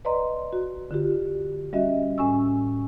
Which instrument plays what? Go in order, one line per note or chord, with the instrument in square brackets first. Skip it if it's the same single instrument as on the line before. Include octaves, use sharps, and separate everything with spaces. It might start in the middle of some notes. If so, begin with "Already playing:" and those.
[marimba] B4 D5 D#5 A#5 C6
F#4
D3 F4 G4
G3 C#4 F#4 D#5 E5
A2 C#4 G#5 C#6 E6